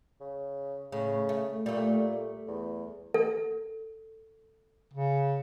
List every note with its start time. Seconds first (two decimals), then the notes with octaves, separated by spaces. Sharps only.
0.20 C#3
0.92 A2 C#3
1.29 A3
1.66 A#2 G3 A3
2.48 E2
3.14 A4
4.94 C#3